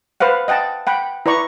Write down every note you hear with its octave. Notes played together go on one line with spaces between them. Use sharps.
B4 C5 F5 F#5
D#5 F#5 G5 A5
F#5 G5 B5
E4 B4 D5 A#5 C#6